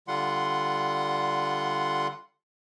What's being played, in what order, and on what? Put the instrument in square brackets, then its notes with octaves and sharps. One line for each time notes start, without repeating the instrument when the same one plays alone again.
[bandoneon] D3 G3 F4 F#5 C6